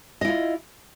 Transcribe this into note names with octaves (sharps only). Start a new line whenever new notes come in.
E4 F4 D#5